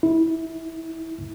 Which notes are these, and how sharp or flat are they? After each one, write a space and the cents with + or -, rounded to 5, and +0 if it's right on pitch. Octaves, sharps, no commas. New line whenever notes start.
E4 -20